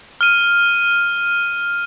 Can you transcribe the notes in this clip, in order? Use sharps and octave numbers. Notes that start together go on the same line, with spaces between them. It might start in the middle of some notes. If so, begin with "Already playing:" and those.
F6 D#7